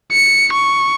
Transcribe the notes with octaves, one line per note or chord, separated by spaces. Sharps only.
C#7
C#6